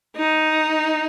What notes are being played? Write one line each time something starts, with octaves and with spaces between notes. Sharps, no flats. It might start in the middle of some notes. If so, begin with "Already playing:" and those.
D#4